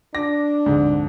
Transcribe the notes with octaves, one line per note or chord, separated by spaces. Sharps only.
D4 D6 A#6
F1 D2 G#2